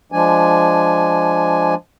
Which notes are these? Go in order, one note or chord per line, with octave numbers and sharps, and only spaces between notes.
F3 G#3 D4 G#5